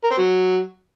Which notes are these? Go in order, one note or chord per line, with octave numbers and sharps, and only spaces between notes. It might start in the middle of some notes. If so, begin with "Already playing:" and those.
A#4
C4
F#3